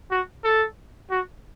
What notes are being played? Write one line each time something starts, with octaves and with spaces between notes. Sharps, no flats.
F#4
A4
F#4